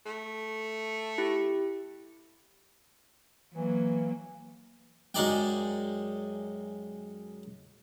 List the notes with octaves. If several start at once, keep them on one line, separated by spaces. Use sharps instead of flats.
A3
E4 G4
E3 F#3 A#3
F#2 G#3 D#4 D5 G5